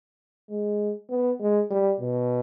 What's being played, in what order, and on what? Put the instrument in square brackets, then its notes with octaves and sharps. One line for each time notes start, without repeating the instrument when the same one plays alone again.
[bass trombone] G#3
B3
G#3
G3
B2